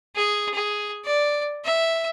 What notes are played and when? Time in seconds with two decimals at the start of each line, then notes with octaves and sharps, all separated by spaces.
0.16 G#4
0.54 G#4
1.05 D5
1.65 E5